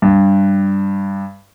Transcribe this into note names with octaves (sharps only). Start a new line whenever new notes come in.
G2